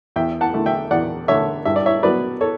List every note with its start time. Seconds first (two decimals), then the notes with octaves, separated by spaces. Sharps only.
0.16 E2 E5 G5
0.41 F#5 A5
0.53 D3 A3
0.66 E5 G5
0.91 E2 D5 F#5
1.28 D3 A3 C#5 E5
1.65 G2 E5
1.76 D5
1.86 C#5 E5
2.03 F#3 B3 B4 D5
2.41 A4 C#5